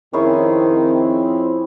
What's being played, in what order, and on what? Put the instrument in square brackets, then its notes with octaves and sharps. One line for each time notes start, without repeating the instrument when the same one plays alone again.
[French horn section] F2 C4 [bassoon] D#3 [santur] C#4 E4 G#4